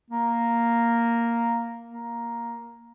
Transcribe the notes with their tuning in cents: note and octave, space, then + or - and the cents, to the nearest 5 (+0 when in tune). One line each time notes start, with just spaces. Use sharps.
A#3 +0
A#3 +5